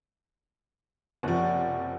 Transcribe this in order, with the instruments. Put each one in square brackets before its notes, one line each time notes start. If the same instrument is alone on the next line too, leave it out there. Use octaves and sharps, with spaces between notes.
[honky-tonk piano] F#1 C3 F3 [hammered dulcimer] C#5 D5 F#5